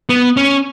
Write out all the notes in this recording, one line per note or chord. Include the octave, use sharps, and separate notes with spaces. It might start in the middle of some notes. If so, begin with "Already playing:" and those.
B3
C#4